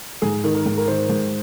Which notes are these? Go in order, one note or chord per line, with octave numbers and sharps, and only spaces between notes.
G#2 G#4
D#3
A#4
G#2
A#4
D#3 C5
G#2